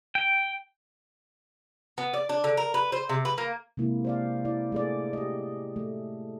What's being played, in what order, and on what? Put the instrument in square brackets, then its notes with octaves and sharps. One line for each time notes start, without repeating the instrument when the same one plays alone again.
[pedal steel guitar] G5
[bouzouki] B3
D5
D4
D3
A#4
B4
C5
C3
B4
A#3
[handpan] C3 G#3 A#3 E4
C5 D5 F5
E4 D5
A3 G#4 D5
G4 D#5
A3